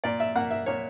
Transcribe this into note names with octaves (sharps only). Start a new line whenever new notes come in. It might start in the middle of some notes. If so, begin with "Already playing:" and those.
A#2 D5
E5
A#3 F#5
E5
A#2 C#5